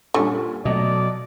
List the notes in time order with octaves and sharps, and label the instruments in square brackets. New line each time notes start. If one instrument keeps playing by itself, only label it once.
[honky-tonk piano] A#2 G3 [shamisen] D3 C#4
[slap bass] B2 F#3 [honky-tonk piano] A3 D#5 [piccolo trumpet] D5